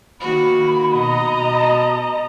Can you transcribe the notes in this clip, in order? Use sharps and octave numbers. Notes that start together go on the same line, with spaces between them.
D#3 A#3 F#4 B5
B2 D#5 A#5